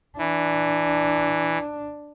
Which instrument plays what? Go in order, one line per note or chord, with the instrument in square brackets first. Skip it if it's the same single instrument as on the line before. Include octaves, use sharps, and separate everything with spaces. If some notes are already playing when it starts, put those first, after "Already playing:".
[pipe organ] E3 [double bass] D4